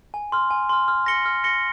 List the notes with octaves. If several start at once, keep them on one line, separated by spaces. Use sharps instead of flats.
G#5
C6 F6
G#5
C6 F6
F6
A#6 C#7 G7
F6
A#6 C#7 G7